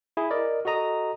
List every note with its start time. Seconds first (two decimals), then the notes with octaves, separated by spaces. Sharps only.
0.17 E4 G#4
0.30 A#4 D5 D#5
0.65 F#4 A4 D#5 A#5 D#6